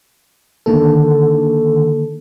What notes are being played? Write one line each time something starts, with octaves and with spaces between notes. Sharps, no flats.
D3 D#3 A#3 A4